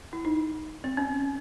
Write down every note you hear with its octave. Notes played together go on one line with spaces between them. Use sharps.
E4
D#4
C4
C#4